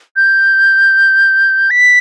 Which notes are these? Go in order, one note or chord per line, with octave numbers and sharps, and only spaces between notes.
G6
B6